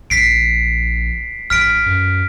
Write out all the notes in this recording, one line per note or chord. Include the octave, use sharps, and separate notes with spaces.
A#1 B6 C7 D7
A1 F6 B6 D7
F#2